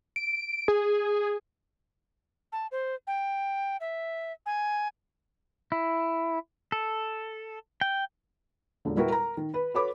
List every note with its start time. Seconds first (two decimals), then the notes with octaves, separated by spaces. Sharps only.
0.16 D7
0.68 G#4
2.52 A5
2.72 C5
3.07 G5
3.81 E5
4.46 G#5
5.72 E4
6.72 A4
7.81 G5
8.85 E1 A#2 D3
8.96 G3 E4 F#4 A#4 B4
9.10 A#4 A#5
9.37 D#3
9.54 B4 B5
9.74 F#4 A4 B4 C#5 B5 D6